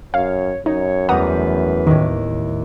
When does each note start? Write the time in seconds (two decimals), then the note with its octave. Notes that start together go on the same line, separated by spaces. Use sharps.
0.14 F#2 C#5 F5
0.66 F#2 D#4 C#5
1.09 E2 G3 A3 B4 F#5 A#5 D#6
1.87 D#2 A2 D#3